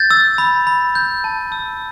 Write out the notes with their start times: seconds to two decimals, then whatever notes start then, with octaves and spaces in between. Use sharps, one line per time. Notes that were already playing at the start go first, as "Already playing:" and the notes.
Already playing: G6 A6
0.11 E6
0.38 B5
0.67 B5
0.95 G6
1.24 A5
1.52 E6